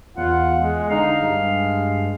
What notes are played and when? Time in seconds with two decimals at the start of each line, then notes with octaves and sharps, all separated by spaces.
0.17 E2 F4 F#5
0.60 G#3
0.90 D3 D#4 F5
1.22 G2 G#3